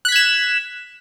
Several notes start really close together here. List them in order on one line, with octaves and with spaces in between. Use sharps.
F#6 B6 G#6 E7